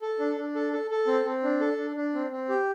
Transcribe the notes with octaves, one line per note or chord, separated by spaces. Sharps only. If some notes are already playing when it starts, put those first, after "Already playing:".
A4
D4
D4
A4
A4
A4
C4
C4
D4
A4
D4
D4
C4
C4
G4